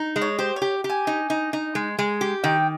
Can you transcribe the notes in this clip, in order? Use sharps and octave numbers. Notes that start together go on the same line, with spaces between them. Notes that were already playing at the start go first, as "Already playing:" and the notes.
Already playing: D#4
G#3
C#5
G4 C5
C#5
G4
G4
G#5
D#4
D#4
D#4
G#3
G#3
G4
D#3 G5